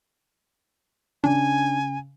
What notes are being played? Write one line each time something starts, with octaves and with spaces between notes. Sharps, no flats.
C#3 D4 G#5